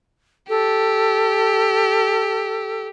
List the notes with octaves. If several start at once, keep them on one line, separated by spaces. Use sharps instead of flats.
G4 A4